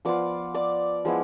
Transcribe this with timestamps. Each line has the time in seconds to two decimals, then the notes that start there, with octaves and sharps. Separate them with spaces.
0.05 F3 B3 F4 D5 D6
0.54 D5 D6
1.05 F3 G#3 B3 E4